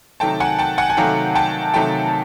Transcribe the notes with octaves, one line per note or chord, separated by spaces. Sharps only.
C3 D#3 F#3 A3 G5 A5
F#5 G#5
G5 A5
F#5 G#5
G#5
C3 D#3 F#3 A3 F5 G5
G5 A5
C3 D#3 F#3 A3 G5 A5